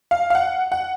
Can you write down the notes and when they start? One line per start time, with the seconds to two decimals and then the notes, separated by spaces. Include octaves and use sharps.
0.11 F5
0.30 F5
0.35 F#5
0.72 F#5